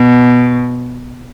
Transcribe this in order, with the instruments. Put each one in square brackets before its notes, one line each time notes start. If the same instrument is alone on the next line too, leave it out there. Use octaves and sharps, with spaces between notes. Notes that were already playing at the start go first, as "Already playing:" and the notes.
Already playing: [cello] B2